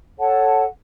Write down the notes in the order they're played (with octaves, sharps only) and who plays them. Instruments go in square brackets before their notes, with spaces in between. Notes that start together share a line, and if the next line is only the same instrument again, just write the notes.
[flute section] A4 C#5 F#5 A5